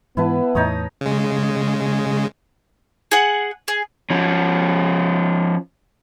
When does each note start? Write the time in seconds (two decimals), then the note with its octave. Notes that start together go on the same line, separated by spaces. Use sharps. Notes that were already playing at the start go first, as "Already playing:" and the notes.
0.17 G#2 E3 B3 E4 B4 A5
0.55 E2 A2 D#4 C#5 D#6
1.01 C#3 G#3
3.12 G#4 F#5
3.68 G#4
4.10 F3 C#4